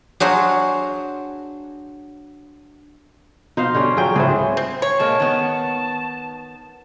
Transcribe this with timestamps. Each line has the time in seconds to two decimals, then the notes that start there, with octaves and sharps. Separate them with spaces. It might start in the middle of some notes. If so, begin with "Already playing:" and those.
0.20 F#3 D4 F#4 G#4 C5 F5
3.57 B2 D#4 C5 F5
3.75 D3 G3 C#4
3.97 F#3 F4 G#4 G5
4.16 C#2 A2 E4 G#4 C5
4.57 C4
4.82 C#5
5.00 A#2 G#3 A#3 A5
5.20 D#3 B3